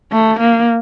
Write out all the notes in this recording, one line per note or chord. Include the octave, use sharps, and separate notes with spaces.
A3
A#3